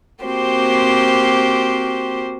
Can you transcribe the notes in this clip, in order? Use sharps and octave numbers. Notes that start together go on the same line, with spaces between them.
A#3 C4 F#4 G4 C5